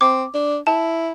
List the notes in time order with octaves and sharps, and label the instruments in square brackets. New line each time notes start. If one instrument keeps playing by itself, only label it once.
[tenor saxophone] C4 [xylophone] D6
[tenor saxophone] D4
[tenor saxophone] E4 [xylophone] A5